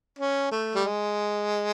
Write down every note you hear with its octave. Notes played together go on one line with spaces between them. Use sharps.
C#4
A3
G3
G#3